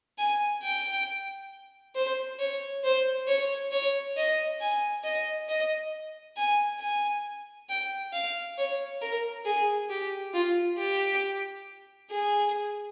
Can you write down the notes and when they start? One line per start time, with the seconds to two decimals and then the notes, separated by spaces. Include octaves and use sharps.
0.18 G#5
0.63 G5
1.95 C5
2.39 C#5
2.84 C5
3.27 C#5
3.72 C#5
4.17 D#5
4.61 G#5
5.04 D#5
5.49 D#5
6.37 G#5
6.80 G#5
7.69 G5
8.13 F5
8.58 C#5
9.01 A#4
9.45 G#4
9.90 G4
10.34 F4
10.78 G4
12.10 G#4